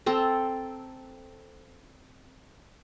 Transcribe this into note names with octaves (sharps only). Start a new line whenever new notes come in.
C4 A4 A#5